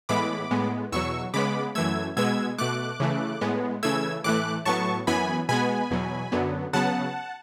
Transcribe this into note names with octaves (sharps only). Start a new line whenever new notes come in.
A2 E3 G#3 B3 B5 D6
A2 G#3 B3
E2 B2 F#3 C#6 E6
C#3 G#3 B3 B5 D6
F#2 E3 A3 E6 G#6
B2 G#3 B3 E6 G#6
B2 A3 D6 F#6
C#3 E3 A3
A2 G#3 B3
C#3 E3 A3 E6 G#6
A2 E3 A3 D6 F#6
A2 F#3 B3 A5 C#6
F#2 E3 B3 G#5 B5
B2 G#3 B3 G#5 B5
E2 B2 F#3
F#2 D3 F#3 B3
C#3 F#3 B3 F#5 A5